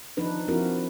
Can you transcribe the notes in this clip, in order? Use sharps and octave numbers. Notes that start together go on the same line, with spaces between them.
F3 D4 D#4 B4
F3 C4 E4 F#4 A#4